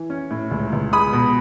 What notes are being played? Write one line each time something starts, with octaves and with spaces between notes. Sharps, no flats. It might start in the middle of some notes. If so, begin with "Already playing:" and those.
Already playing: E3
C#4
A2
C#2
C#2
G#3 B5 D#6
B2